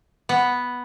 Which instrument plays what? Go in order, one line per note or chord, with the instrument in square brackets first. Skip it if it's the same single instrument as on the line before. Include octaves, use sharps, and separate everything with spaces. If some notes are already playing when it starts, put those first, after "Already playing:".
[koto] B3